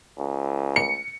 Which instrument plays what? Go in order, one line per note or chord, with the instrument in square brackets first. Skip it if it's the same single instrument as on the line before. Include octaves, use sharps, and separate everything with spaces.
[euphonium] C#2
[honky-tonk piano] C#7